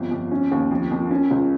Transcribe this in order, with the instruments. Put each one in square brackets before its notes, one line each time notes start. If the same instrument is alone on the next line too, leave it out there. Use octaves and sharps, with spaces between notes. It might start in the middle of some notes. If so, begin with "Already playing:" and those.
Already playing: [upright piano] G1 F2
F2
C#4
D#2
F2
F2
C#4
C#2